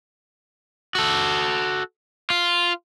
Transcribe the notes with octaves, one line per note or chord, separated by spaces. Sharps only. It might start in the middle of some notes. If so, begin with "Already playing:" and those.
F#4 A4
F4